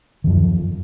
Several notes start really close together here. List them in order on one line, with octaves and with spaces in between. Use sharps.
D#3 F#2 F3